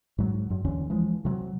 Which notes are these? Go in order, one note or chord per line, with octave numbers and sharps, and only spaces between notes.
G#2 F#3
F#2
D#2 D3 E3 C#4
E3 F3 G#3
C3 F#3